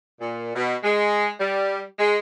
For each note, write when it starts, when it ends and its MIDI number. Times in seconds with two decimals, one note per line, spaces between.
0.20 0.52 46
0.55 0.74 47
0.83 1.30 56
1.40 1.81 55
1.99 2.17 56